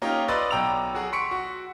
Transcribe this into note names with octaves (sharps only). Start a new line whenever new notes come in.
A#3 C#4 D#4 F4 G4
B4 D5 D#5 C6 E6 A6
B1 G5 A#5 E6 F7
F#3 F#4 G#4
C6 C#6 B6 C#7 D7
F#4